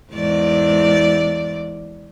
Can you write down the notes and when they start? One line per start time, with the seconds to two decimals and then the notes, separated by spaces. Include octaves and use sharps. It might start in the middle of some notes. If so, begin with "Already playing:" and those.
0.13 E2 G#2 D5